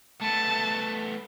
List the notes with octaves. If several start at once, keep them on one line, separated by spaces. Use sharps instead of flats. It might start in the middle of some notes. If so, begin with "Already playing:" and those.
A3 B3 A5